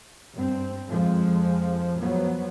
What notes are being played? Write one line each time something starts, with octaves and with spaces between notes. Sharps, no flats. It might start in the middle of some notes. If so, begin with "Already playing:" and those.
G2 C4
F2 F3 G#3
F3 F#3 B3